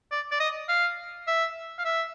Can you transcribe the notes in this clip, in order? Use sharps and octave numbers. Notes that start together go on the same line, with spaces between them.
D5
D5
D#5
F5
E5
F5
E5